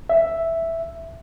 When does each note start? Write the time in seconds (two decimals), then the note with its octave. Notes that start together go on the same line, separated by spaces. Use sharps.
0.10 E5